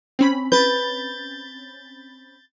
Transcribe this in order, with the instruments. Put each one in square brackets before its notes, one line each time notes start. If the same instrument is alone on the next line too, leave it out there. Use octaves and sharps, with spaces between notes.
[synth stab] C4 C#4 B5
[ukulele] B4 [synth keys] G6 A6